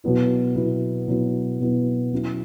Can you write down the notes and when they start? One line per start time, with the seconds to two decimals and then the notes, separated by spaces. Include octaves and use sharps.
0.04 B2 F#3 B3 E4
0.56 B2 F#3 B3 E4
1.08 B2 F#3 B3 E4
1.60 B2 F#3 B3 E4
2.12 F#3 C#4 E4